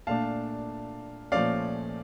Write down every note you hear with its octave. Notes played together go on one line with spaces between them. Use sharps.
A#2 A3 D4 F5 A5
A#2 F3 A3 C#4 D5 F5